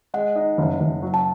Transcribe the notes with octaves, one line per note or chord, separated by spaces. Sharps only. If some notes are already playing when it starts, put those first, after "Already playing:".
G#3 F#5
D#4
F#1
F#1
F#3
A5